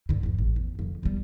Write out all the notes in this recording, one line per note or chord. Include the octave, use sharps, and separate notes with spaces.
G2 D3
G1 E2
A1
E2
F2 C#3
E2 G3